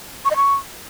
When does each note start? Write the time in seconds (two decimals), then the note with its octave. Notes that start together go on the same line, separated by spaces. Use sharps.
0.25 C#6
0.30 D#5
0.36 C#6